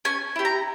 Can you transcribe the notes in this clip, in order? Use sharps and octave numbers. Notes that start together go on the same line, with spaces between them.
C#4 G#5
E4 G4
A#5